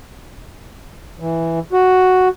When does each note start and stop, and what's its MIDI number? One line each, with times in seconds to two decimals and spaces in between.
1.20 1.59 52
1.73 2.28 66